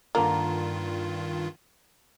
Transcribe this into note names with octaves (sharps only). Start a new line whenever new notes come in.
G2 D3 D#3 A#3 F4